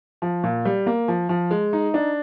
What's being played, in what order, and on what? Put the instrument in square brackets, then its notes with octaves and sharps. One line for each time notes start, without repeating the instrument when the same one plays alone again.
[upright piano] F3
A#2
G3
A#3
F3
F3
G#3
D#4
D4